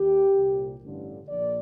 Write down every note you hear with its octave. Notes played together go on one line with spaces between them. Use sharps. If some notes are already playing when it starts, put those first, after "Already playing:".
Already playing: D#2 D#3 G4
C2 A#2
A1 G2 D3
A#1 A#2 D5